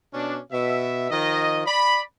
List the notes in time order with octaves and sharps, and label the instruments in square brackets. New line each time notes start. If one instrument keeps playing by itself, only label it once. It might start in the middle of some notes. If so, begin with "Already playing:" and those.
[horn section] B2 C#4 D4
B2 E5
D#3 F3 D#5
D5 B5